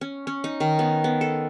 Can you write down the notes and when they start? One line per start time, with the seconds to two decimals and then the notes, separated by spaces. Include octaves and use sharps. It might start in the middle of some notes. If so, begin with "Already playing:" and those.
0.01 C#4
0.27 C#4
0.44 D#4
0.60 D#3
0.79 B3
1.04 B3
1.21 A4